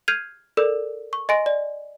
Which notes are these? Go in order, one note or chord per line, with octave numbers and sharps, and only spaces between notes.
F6 G6 G#6 C7 D#7 F7
A4 A#4 D5 E6
C#6
D#5 G#5 C6 A#6 D7
D5